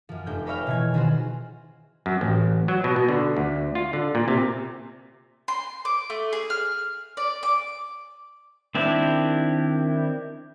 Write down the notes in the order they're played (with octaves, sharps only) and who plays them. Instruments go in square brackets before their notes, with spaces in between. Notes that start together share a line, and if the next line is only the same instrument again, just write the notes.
[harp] F#2 F3
F1 G6
A#4 B4 C#5 E5 F5 G5
B2 E3 G#6
D#3 B3 F4 F#4 G#4 C5
[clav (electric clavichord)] F#2
A1
F#3
B2
B2
D3
D2
F4
D3
A#2
C3
[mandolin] C6
D6
A3
G#4
F6
D5
D6
[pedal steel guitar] D#3 C4 D4 E4 G4